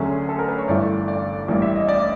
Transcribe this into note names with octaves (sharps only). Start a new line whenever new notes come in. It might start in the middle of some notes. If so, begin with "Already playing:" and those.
Already playing: D2 D3 F#3 A3 C#4 G#4
A4
A#4
B4
C#5
G1 G2 E3 A3 D5
D5
A1 G2 E3 G3 A#3 D5
E5
D#5
D5